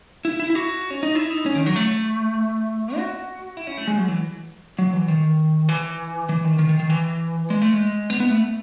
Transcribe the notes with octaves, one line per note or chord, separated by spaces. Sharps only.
E4
E4
E4
F#4
C#4
D#4
E4
D#4
C#4
D#3
F#3
A3
F#4
E4
C#4
A3
G#3
F#3
E3
F#3
E3
D#3
E3
E3
D#3
D#3
D#3
D#3
E3
G#3
A3
G#3
B3
B3
A3